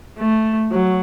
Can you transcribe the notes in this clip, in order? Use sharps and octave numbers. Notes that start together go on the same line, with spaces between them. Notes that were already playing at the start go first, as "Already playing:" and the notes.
A3
F#3